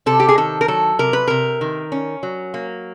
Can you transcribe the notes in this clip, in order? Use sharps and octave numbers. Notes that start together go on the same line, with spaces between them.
C3 A4
G4
G#4
D#3 A4
A#4
F#3 A4
C3 A#4
B4
C3 A#4
D#3
C#4
F#3
A#3